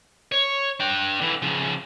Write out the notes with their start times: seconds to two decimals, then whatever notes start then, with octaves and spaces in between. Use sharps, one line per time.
0.32 C#5
0.80 D4 G5
1.21 D3 E3
1.42 C#3 F3